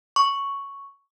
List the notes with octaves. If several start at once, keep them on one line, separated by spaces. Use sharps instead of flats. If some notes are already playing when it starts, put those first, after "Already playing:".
C#6